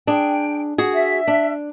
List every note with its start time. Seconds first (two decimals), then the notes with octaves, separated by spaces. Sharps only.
0.07 D4 G#4 G5
0.78 F#4 G#4
0.93 E5
1.27 D4